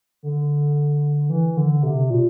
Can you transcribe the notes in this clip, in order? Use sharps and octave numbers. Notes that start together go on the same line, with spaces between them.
D3
E3
D3
C3
A#2